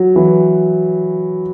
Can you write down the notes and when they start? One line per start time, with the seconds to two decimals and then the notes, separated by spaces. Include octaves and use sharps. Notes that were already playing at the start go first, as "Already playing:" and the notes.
Already playing: F#3
0.16 E3